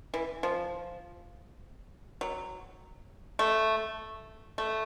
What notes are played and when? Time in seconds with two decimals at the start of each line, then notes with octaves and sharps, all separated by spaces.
0.14 E3
0.43 F3
2.21 F#3
3.39 A3
4.58 A3